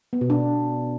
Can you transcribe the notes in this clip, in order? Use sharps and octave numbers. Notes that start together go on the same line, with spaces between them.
B3
B2
D4